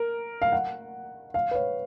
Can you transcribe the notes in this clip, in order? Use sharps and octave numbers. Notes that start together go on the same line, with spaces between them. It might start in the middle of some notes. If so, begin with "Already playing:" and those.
Already playing: A#4
F5
F#5
F5
B4
C#5